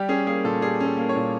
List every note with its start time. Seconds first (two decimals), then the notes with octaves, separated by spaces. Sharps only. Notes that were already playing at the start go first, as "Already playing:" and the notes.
Already playing: G3 G4
0.09 C#4 G#4
0.27 A#3 G#4
0.44 A#2 A4
0.61 G3 G#4
0.80 C#4
0.86 A4
0.97 A#3
1.09 C#5
1.16 A#2